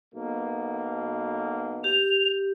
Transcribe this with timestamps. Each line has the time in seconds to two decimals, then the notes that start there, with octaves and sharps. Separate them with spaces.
0.15 B1 B2 A#3
1.84 G4 F7